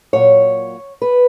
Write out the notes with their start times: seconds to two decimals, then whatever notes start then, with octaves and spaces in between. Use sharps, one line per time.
0.13 A#2 F#3 C#5
1.02 B4